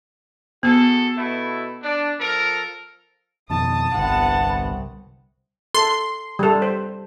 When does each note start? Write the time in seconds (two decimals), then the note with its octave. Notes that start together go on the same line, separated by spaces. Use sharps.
0.63 B3 F#4 G#4 A4
1.17 B2 A3 E4
1.83 D4
2.19 F3 A4 A#4
3.50 F2 B2 D#3 A5 D#6
3.94 G1 C2 B3 F#5
5.74 A4 C6
6.39 G3 A4
6.62 C5